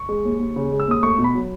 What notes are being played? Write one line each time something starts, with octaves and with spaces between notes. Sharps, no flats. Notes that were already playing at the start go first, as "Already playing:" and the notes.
Already playing: C#6
G#3
D#2
D#2
C#3
G#3
E6
D#2 D#6
A3 C#6
B2
B5
F#3